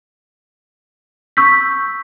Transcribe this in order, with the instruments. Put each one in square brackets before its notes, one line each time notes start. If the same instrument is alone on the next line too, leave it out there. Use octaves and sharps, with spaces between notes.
[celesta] C#6 E6 G6 B6